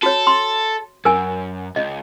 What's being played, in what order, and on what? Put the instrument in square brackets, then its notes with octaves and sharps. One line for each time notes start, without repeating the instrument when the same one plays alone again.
[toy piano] F#4 C#5 [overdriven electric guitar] A4
[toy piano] C6
[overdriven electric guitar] F#2 [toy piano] A#4 G#5
[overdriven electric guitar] C#2 [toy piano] D#5